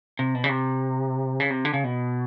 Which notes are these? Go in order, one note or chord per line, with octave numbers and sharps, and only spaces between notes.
C3
B2
C#3
C3
C#3
C3
D3
C#3
B2